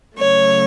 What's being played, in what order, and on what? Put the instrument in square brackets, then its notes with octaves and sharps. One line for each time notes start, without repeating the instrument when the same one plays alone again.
[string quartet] C#3 F#3 A3 C#5